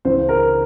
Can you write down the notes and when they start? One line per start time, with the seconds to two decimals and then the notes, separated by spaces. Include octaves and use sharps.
0.05 C#2 C#3 E3 C5
0.29 A#4